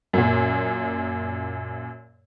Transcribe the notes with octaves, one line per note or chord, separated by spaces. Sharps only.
F#2 A#2